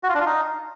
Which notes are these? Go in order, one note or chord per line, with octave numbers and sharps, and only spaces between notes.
F#4
F4
D4
F4
D#4